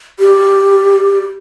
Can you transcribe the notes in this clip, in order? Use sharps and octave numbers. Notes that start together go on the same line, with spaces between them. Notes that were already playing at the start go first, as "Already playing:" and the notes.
G4